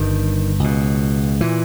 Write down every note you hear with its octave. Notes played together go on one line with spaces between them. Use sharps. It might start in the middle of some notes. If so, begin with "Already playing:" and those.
Already playing: G1 G2 D#3
C#2 B2
A#2 E3